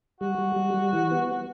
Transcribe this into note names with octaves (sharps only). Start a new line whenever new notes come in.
G3 F#4
G3
G3
G3
E3
B3